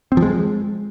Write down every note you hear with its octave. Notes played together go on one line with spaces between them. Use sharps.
C4
F3
G#3